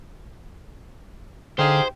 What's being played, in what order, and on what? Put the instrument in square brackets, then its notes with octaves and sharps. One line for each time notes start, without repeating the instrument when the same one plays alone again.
[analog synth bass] D3 [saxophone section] D#4 G#4 F5 [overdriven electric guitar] G4 [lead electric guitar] C5